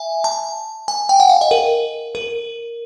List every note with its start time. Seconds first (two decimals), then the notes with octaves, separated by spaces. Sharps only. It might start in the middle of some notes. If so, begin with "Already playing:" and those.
Already playing: E5 G#5
0.24 A5
0.88 G#5
1.09 G5
1.20 F#5
1.30 F5
1.41 D#5
1.51 A#4
2.15 A#4